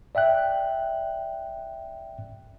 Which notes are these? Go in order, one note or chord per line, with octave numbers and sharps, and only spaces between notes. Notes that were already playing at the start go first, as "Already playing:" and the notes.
D5 E5 G5 F#6